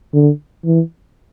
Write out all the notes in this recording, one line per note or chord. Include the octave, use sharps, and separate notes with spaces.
D3
E3